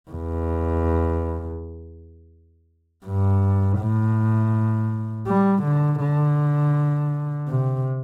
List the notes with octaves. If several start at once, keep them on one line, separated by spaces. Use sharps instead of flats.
E2
G2
A2
G3
D3
D3
C3